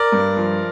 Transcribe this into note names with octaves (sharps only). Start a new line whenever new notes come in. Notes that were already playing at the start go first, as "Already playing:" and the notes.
Already playing: A#4 D5
G2
F3